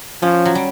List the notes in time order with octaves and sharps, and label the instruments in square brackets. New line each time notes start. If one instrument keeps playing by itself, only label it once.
[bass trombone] F3 [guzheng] C#4
[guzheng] F#3
G3